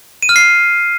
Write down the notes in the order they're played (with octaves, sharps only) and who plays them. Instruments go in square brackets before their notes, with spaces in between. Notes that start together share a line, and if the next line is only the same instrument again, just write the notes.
[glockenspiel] D#7
F6
C7